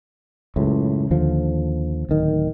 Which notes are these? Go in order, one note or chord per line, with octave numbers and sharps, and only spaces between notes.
C#2 F#2 A2
D#2 D3 F3
D1 D#3